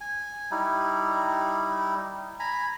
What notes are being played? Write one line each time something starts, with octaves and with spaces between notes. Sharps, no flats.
G#5
G3 D#4 E4
G#5 A#5 B5